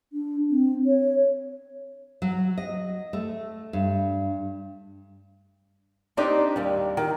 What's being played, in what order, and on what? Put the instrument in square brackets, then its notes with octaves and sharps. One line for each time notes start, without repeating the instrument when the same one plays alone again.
[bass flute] D4
C4
C#5
[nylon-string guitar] F#3
D#5
A3
G2
C4 D4 D#4 G4 D5 D#5
D#2 G3
D#3